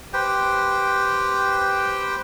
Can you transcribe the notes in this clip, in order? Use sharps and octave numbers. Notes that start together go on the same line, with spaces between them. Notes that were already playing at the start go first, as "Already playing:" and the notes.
G4 B4 C5 G5